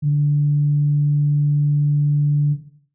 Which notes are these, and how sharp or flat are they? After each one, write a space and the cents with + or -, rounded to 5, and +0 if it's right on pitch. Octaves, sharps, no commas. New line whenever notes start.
D3 -10